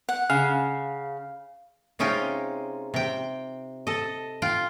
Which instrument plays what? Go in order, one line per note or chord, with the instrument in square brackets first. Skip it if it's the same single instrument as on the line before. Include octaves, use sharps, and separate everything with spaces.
[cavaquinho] F#5
[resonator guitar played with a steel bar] C#3 [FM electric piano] F5
[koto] C3 G#3 C#4 D#4 F4 G5
C3 G5
A4 D#5
F4 G5